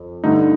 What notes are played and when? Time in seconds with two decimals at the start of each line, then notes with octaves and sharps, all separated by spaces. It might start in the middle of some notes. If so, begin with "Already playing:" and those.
Already playing: F2
0.24 G2 D3 A3 D#4